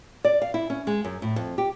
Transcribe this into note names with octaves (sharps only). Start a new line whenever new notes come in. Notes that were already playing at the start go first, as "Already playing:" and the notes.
D5
F5
E4
C#4
G#3
F#2
A2
F2
G4